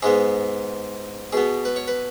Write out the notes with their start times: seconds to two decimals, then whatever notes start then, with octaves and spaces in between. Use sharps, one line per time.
0.02 G#2 G#3 B3 G#4
1.33 B2 B3 G#4
1.65 B4
1.76 C#5
1.88 B4